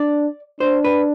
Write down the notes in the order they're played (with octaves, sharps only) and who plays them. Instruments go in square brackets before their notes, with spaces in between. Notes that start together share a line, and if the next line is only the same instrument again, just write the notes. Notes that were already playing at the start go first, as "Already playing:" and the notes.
Already playing: [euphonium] D4 [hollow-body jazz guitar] D5
[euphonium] D4 [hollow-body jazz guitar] C5
[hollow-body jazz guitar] B4